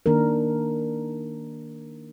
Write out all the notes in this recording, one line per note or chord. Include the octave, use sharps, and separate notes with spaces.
D#3 A#3 D4 A#4